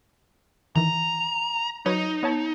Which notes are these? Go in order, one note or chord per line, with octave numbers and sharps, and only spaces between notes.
D#3 E3 A#5
F#3 D#4 B4 C#5
B3 C#5 A5